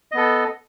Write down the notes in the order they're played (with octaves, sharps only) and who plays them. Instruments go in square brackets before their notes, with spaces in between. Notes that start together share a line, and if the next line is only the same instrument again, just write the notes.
[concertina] D#5
B3
A4